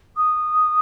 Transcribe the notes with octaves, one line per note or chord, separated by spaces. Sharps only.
D#6